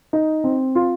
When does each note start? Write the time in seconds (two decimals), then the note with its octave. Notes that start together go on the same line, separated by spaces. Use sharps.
0.13 D#4
0.44 C4
0.75 F4